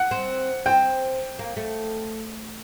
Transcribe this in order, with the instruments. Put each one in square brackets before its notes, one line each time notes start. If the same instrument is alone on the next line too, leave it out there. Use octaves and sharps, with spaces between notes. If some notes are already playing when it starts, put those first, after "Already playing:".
Already playing: [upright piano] F#5
[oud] C4
[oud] C4 [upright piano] G5
[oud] A#3
A3